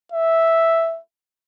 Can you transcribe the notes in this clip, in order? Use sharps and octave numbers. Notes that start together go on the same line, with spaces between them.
E5